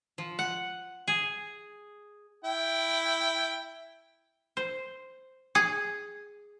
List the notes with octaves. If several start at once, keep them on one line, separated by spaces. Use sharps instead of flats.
F3
F#5
G#4
E4 G5
C5
G#4